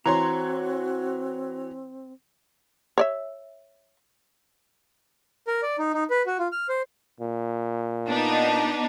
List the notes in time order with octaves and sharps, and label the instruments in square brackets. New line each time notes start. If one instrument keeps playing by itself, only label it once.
[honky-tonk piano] E3 C#5 C6 [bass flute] C4 [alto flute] F#4 [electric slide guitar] A#5
[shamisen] C#5 D5 E5
[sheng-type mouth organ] A#4
D5
D#4
D#4
B4
F#4
F4
F6
C5
[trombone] A#2
[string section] B3 D4 D#4